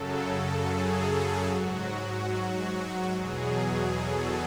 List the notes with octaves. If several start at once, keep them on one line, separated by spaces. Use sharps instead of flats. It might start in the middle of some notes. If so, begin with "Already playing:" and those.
Already playing: F#2 C#3 F#3 A4
G#4
G#2 F#3 F#4
E2 B2 F#3 G#4
A4